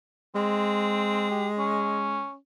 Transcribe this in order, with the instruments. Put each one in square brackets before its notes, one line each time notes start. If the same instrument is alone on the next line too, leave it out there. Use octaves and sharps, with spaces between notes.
[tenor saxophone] G#3 [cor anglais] C4
[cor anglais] G4
C#4